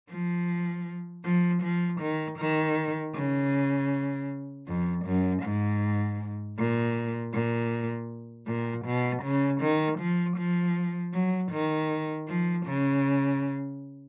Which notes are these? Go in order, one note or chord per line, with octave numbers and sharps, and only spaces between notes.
F3
F3
F3
D#3
D#3
C#3
F2
F#2
G#2
A#2
A#2
A#2
B2
C#3
D#3
F3
F3
F#3
D#3
F3
C#3